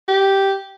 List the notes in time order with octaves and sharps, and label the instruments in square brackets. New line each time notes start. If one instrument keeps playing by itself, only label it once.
[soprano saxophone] G4